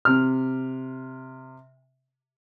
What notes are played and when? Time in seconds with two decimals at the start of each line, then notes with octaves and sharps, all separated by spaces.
0.05 C3 F6